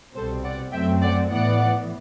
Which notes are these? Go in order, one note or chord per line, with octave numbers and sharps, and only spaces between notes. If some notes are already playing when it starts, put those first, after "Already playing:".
C2 B2 G3 C4 A4 C5
D5 F#5
F#2 F#3 A3 C4 E5 G5
D5 F#5
A2 E3 B3 D5 F#5